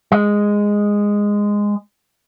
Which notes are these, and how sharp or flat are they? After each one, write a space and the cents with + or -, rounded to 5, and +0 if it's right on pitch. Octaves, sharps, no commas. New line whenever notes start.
G#3 -10